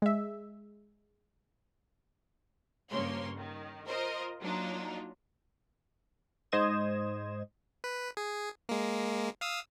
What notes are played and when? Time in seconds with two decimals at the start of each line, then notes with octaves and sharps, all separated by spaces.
0.02 G#3 E5
2.90 G2 C#3 F3 A#3 C#5 C6
3.35 D#3
3.87 F4 A#4 C5 D#5
4.41 F#3 A#3 D4 D#4 F4
6.52 G#2 C5 D#5 D#6 G#6 E7
7.84 B4
8.17 G#4
8.69 G#3 A#3
9.41 F5 D#6 E6